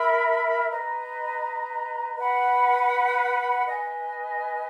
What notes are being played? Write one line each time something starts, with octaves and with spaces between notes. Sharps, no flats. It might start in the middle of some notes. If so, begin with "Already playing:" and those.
Already playing: A#4 E5 B5
B4 D#5 A#5
B4 F#5 B5
B4 D#5 G#5